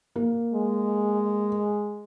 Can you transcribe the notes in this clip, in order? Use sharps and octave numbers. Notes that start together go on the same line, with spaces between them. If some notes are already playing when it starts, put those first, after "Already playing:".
A#3
G#3